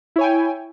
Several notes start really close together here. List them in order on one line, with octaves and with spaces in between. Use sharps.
E4 C#5 G#5 G5